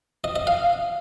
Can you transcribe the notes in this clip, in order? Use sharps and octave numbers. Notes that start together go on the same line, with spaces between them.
D#5
D#5
F5